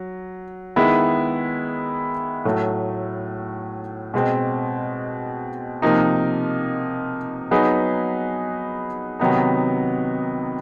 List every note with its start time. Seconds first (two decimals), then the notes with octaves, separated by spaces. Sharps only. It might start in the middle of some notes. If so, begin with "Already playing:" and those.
Already playing: F#3
0.76 D#3 G#3 B3 E4
2.45 A2 F#3 A3
4.14 B2 G#3 C4
5.82 C3 F3 A#3 D#4
7.51 F#3 B3 D#4 G#4 B4
9.19 C3 D#3 F#3 B3 D#4